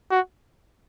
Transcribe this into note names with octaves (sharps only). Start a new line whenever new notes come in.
F#4